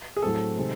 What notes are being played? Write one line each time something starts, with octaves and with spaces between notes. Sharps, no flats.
G#4
A2 F#3 A3 C4 A4
C3 D#3 G#3 C4